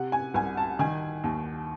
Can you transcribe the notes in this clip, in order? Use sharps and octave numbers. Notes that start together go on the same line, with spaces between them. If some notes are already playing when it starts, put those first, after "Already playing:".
Already playing: C3 F#5
G#5
C2 G#5
A5
D#3 G#5
D#2